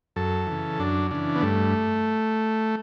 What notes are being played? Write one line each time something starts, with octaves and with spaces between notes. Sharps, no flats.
F#2 A4
C#3 E3
F#2 D4
C#3 E3 D4
B3
G2 A3